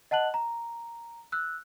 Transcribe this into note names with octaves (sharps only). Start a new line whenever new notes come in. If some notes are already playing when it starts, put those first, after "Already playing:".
D#5 F#5 A5 F#6 F#7
A#5
E6 F#6